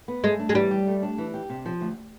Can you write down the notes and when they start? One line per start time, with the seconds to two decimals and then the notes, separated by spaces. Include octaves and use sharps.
0.08 B3
0.23 G#3 A3
0.39 D4
0.49 G#3
0.55 E3 G3
0.71 G4
0.87 A3
1.03 D4
1.18 E3
1.34 G4
1.50 C3
1.66 F3
1.81 D2